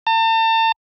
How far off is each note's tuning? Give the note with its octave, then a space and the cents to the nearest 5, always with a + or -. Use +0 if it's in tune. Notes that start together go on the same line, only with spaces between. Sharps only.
A5 +40